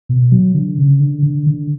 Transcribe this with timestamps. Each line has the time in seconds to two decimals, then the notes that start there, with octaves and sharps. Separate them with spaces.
0.09 B2
0.32 F#3
0.54 D3
0.78 C#3
1.00 D3
1.22 D3
1.46 D3